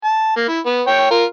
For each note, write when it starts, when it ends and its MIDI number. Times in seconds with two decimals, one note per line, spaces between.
0.04 0.35 81
0.36 0.47 58
0.48 0.59 64
0.66 0.82 59
0.87 1.10 73
0.87 1.10 79
1.11 1.24 65
1.11 1.24 70